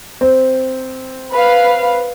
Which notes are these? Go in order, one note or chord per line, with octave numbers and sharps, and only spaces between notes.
C4
B4 F5